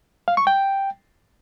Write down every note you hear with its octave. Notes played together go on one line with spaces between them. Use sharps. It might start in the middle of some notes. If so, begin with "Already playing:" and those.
F5
C#6
G5